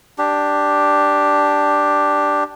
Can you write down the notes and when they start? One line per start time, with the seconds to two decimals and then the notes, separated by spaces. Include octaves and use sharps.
0.18 D4 G4